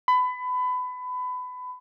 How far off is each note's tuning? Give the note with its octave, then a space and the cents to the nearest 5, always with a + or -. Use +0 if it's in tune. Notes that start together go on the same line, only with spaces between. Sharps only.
B5 +25